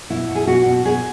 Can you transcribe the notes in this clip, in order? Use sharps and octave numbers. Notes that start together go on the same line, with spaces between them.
B2 E4
B2
G#4
B2 F#4
B2
B2 G#4